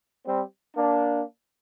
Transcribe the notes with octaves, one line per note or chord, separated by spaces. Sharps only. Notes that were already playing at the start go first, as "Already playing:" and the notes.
G3 C4
A#3 D4